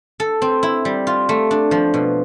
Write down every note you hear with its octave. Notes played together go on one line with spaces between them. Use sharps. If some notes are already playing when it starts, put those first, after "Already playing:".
A4
C4
E4
G3
F4
A3
D4
F3
B2